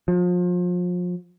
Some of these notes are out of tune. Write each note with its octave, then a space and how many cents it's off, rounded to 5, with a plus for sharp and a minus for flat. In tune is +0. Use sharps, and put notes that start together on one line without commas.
F3 +35